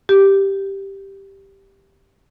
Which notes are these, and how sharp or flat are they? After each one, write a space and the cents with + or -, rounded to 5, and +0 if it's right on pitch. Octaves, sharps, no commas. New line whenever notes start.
G4 +0